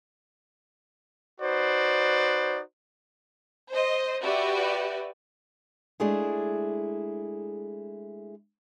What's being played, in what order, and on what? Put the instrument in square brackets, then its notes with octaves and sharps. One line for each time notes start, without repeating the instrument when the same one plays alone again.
[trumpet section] D#4 F#4 B4 C5 D5
[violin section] C5 D#5
F#4 G4 B4 D5 E5
[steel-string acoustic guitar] G#3 A3 D4 E4 G#4